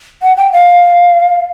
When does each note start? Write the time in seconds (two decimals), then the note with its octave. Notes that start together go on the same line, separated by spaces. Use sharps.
0.22 F#5
0.37 G5
0.53 F5